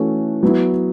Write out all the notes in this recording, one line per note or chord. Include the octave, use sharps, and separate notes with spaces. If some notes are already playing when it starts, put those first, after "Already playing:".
Already playing: E3 A3 C#4 F#4 A4
F#3 B3 E4